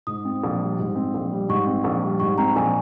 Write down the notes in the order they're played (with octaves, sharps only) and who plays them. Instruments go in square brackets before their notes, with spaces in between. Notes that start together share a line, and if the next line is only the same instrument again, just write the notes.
[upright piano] G#2 [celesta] D#6
[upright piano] C4
A#1
G3
G#2
C4
A#1
G3
[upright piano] G#2 [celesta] C#6
[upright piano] C4
A#1
G3
[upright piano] G#2 [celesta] C#6
[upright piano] C4 [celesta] A#5
[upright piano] A#1 [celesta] G#5